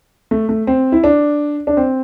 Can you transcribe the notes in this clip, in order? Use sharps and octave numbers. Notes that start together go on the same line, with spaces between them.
A3
A3
C4
E4
D4
D4
C4